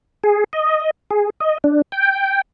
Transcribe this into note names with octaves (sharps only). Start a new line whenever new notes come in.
G#4
D#5
G#4
D#5
D4
G5